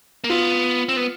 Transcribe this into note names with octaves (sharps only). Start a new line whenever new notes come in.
A#3
B3 F4
C4
B3